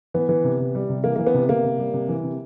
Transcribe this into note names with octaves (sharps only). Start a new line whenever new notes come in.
E3 B3
E3
C3
C3
G3
C3
E3 A#3
E3 A#3
B3
C3
C3 A#3
C3
G3
C3
E3
C3